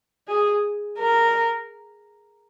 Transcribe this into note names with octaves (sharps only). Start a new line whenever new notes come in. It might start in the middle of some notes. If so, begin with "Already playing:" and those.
G#4
A#4